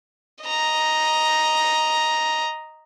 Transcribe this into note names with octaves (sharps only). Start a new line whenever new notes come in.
D#5 A#5